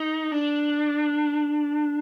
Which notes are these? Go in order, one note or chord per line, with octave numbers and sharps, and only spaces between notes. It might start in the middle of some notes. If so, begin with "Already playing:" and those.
Already playing: D#4
D4